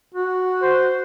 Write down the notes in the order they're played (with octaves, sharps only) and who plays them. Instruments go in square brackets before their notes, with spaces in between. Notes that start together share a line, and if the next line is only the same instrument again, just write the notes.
[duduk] F#4
[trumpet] C5